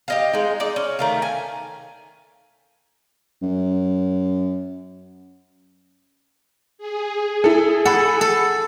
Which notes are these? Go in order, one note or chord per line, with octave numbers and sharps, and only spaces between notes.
G4 D#5 F5
G#3 D#4
D#4 D5
C#4
D#3 A3 F5
G#5
F#2
G#4
E4 A4
A4 F#5 B5
A4